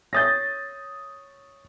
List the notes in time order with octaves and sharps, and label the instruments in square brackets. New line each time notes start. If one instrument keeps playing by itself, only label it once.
[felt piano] C#5 D#6 [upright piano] G6 A6 A#6